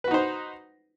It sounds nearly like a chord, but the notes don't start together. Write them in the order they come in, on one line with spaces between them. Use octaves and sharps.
B4 F#4 D#4 C5